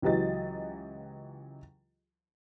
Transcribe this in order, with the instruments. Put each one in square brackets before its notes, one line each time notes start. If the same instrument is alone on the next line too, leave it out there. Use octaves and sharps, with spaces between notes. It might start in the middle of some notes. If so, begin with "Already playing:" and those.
[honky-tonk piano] C#2 E3 F#3 G4 D#5 A6